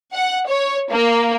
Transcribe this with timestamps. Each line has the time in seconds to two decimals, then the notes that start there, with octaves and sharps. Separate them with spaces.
0.14 F#5
0.48 C#5
0.89 A#3